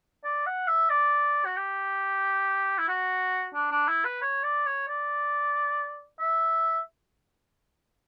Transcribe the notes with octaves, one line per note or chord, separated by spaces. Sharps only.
D5
F#5
E5
D5
F#4
G4
E4
F#4
D4
D4
E4
B4
C#5
D5
C#5
D5
E5